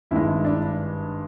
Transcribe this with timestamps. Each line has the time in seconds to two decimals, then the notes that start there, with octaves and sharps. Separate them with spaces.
0.11 G#1 G2 D#3 G#3 E4
0.45 D4